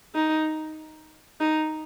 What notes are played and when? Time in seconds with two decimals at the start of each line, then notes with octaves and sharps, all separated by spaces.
0.15 D#4
1.40 D#4